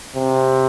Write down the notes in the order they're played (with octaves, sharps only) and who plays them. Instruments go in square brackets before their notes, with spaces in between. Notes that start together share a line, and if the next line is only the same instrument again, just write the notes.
[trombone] C3